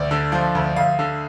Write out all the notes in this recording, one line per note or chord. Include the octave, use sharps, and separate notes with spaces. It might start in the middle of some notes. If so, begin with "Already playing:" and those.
Already playing: D2 D5
D3
F3
D2
D2 F5
D3